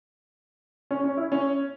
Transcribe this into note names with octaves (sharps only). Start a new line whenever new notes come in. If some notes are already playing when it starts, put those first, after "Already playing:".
C#4
C#4
E4
C#4